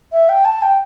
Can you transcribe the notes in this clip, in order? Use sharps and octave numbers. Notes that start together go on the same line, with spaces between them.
E5
G5
A5
G5